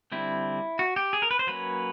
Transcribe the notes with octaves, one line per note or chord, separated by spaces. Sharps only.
D3 G3 C4 E4
F#4
G4
G#4
A#4
B4
C5
F#3 A#3 C#4 B4